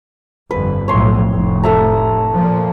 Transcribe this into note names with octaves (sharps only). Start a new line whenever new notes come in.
G1 F2 B4
B1 F2 A2 C#5 C6
F1 A2
A4 E5 A#5
A#2 F3